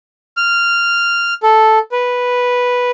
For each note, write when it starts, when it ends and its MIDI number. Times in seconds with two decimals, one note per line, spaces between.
0.37 1.34 89
1.43 1.78 69
1.92 2.91 71